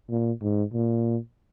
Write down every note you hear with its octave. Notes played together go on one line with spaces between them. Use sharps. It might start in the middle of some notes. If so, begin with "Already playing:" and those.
A#2
G#2
A#2